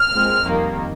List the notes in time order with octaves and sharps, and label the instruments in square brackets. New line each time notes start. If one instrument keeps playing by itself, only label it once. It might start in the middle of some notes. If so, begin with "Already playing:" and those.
Already playing: [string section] F6
A#2 G#3 C4
F2 D#3 G3 A#3